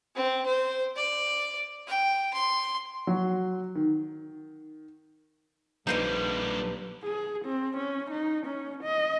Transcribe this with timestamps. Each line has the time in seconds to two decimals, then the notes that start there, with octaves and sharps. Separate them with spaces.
0.15 C4
0.46 C5
0.96 D5
1.88 G5
2.34 C6
3.07 F#3 F#4
3.75 D#3
5.87 A#1 D3 G3 A#3 D#4 B4 C5 D#5
7.03 G#4
7.45 C4
7.77 C#4
8.10 D#4
8.46 C#4
8.83 D#5